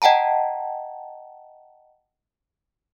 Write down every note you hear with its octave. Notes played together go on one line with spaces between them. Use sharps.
D#5 F#5 G5 A5 A#5